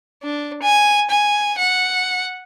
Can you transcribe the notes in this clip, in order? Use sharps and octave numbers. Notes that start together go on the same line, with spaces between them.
D4
G#5
G#5
F#5